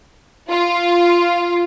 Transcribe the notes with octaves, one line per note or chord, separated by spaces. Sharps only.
F4